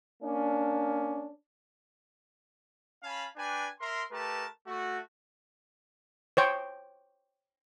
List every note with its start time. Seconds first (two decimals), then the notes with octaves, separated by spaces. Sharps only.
0.23 A#3 C#4 D4
3.03 C#4 F5 G#5 A5 B5
3.36 D4 B4 D5 G5 G#5
3.79 A#4 E5 C6
4.12 A3 G4 A#4 B4 A5
4.66 A3 F#4
6.37 C5 C#5 G5